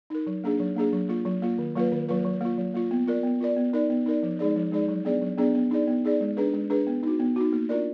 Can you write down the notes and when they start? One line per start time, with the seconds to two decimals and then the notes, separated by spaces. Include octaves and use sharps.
0.10 D#4 A#4
0.27 F#3
0.44 A#3 D4 G#4
0.60 F#3
0.76 A#3 D4 G#4
0.93 F#3
1.09 A#3 F4
1.26 F#3
1.42 A#3 F4
1.59 D#3
1.75 F#3 A#3 F4 B4
1.92 D#3
2.08 F#3 A#3 F4 B4
2.25 F#3
2.41 A#3 F4
2.58 F#3
2.74 A#3 F4
2.91 B3
3.07 F4 A#4 D5
3.23 B3
3.40 F4 A#4 D5
3.56 B3
3.73 D#4 A#4 D5
3.89 B3
4.06 D#4 A#4 D5
4.23 F3
4.39 G#3 D#4 G#4 D5
4.56 F3
4.72 G#3 D#4 G#4 D5
4.88 F#3
5.05 B3 D4 G#4 D5
5.21 F#3
5.38 B3 D4 G#4 D5
5.54 B3
5.71 D#4 G#4 D5
5.87 B3
6.04 D#4 G#4 D5
6.21 G#3
6.37 D4 G#4 B4
6.54 G#3
6.70 D4 G#4 B4
6.87 B3
7.03 D#4 F#4
7.20 B3
7.36 D#4 F#4
7.53 A#3
7.69 D4 F4 A#4 D5